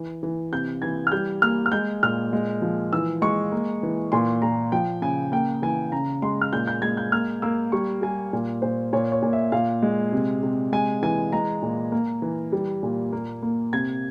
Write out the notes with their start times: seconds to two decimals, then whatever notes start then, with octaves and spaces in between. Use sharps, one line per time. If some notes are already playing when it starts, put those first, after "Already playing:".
Already playing: E3
0.23 E3
0.52 C3 G6
0.82 E3 G#6
1.07 F6
1.12 G3 G6
1.42 A#3 F6
1.66 F6
1.72 G#3 G6
2.03 A#2 F6
2.33 G#3
2.62 F3
2.93 E3 E6
3.22 G#3 C#6
3.52 A#3
3.83 E3
4.12 A#2 C6
4.42 A#2 A#5
4.72 F3 G5
5.02 C#3 G#5
5.32 A#3 G5
5.62 E3 G#5
5.92 C#3 A#5
6.22 G#3 C6
6.41 F6
6.53 A#2 G6
6.67 G6
6.82 G#3 G#6
6.97 G6
7.12 A#3 F6
7.42 A#3 E6
7.72 G3 C#6
8.02 G3 G#5
8.33 A#2
8.62 A#2 C5
8.93 A#2 C#5
9.12 C#5
9.22 A#2
9.33 E5
9.52 A#2 F5
9.82 G#3
10.12 C3
10.43 C3
10.72 G#3 G#5
11.02 E3 G#5
11.32 G#3 A#5
11.62 A#2
11.92 A#3
12.22 E3
12.52 G3
12.83 A#2
13.13 A#3
13.43 A#3
13.73 C3 G#6